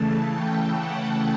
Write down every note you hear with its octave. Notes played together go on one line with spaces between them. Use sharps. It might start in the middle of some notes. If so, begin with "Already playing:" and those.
Already playing: C#3 E3 A3 A5
G5
F#5